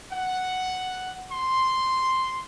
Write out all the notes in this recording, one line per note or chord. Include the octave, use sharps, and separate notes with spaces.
F#5
C6